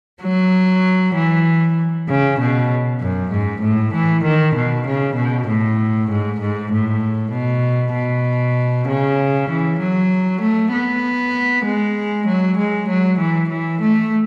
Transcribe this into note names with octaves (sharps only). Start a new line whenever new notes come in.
F#3
E3
C#3
B2
F#2
G#2
A2
E3
D#3
B2
C#3
B2
A2
G#2
G#2
A2
B2
B2
C#3
E3
F#3
A3
B3
G#3
F#3
G#3
F#3
E3
E3
A3